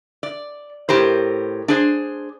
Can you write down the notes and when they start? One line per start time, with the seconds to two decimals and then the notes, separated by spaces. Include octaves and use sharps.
0.23 D5
0.89 A2 G4 A#4 C5
1.68 D4 G#4 C5